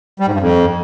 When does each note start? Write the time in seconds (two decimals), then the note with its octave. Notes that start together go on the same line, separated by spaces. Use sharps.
0.20 G3
0.26 G#2
0.33 G2
0.40 F2